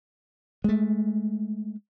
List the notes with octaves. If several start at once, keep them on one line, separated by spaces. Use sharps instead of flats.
G#3 A3